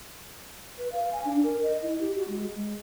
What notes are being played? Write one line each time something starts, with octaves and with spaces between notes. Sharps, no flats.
B4
F5
G#5
D4
A#4
D#5
E4
G4
F#4
G#3
G#3